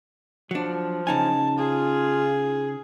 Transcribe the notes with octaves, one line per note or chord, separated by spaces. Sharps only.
F3 F#3 D4
C#3 D#4 G#5 A5
F4 G#4